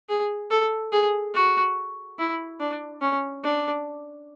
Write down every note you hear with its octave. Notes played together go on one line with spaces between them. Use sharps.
G#4
A4
G#4
F#4
E4
D4
C#4
D4